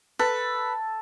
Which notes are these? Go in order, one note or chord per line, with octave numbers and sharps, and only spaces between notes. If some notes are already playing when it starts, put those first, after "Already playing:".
A4 B4